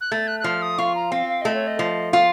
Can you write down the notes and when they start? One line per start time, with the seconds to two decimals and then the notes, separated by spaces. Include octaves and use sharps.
0.01 F#6
0.12 A3 A6
0.27 F#6
0.40 F#6
0.44 F3 F6
0.62 D#6
0.79 F4 C#6
0.95 A#5
1.12 C4 F5
1.29 F5
1.41 A3 D#5
1.55 C#5
1.67 D#5
1.79 F3
2.12 F4 F5